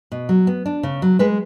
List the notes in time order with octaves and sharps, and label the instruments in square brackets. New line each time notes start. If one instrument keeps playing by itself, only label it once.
[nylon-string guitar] B2
F#3
B3
D4
C#3
F#3
G#3 B4